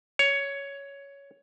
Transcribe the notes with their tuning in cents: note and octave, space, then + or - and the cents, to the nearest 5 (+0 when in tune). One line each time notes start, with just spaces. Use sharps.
C#5 +10